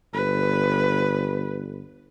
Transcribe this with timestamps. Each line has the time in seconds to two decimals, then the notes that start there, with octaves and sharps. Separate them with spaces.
0.13 G1 B4